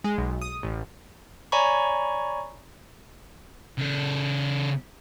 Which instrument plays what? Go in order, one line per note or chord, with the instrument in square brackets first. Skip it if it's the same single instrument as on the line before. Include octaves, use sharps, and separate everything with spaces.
[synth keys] G#3
B1
D#6
A1
[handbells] C#5 D5 G#5 A#5 B5 C#6
[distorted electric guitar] C#3 A4